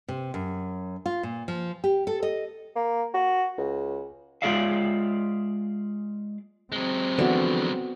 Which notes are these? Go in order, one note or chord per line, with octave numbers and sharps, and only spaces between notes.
C3
F#2
F4
A#2
F3
G4
A4
D#5
A#3
F#4
C#2
G#3 F4 G#4 D5 E5 F5
F#3 G#3 C4
D3 E3 F3 B3 F#4